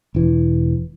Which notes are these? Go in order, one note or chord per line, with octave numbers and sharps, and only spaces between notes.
E1 E3